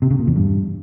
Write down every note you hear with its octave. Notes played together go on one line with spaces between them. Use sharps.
C3
C#3
A#2
E2
G2